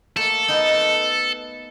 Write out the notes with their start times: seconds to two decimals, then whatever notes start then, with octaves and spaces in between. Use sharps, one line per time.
0.16 A3 A#3 A4
0.48 B3 D#4